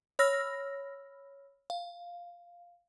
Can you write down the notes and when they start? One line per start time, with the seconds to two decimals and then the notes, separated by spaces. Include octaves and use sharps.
0.19 C#5 B5 E6 F6 A#6
1.70 F5